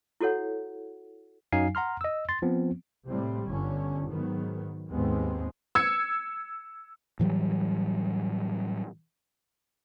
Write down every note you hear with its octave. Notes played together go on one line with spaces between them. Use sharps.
E4 F#4 A4 C#5 F#5
F#2 F#3 D#4 F5 G#5 C7
F#5 A#5 C6 F6
D#5 E6
C6 A6
F3 B3 C4
A2 C3 G3 C4
G1 D3 C#4
G#2 D#3 F#3 B3
D#2 G#2 G#3 B3 C4
E6 G#6 C#7
A2 E3 F#3 G3